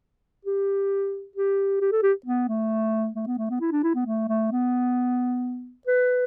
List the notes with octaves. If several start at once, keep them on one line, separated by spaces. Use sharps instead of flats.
G4
G4
G4
A4
G4
B3
A3
A3
B3
A3
B3
E4
D4
E4
B3
A3
A3
B3
B4